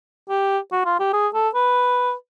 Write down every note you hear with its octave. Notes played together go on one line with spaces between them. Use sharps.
G4
F#4
F4
G4
G#4
A4
B4